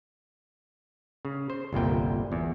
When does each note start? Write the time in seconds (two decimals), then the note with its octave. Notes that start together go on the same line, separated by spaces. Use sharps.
1.25 C#3
1.50 C5
1.73 G1 C2 A#2 G5
2.32 E2